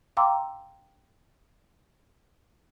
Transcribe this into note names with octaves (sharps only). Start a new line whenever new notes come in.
F5 G5 A#5 C6 D6 E6